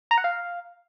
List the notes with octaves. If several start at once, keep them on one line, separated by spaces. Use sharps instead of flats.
A#5
F#5
F5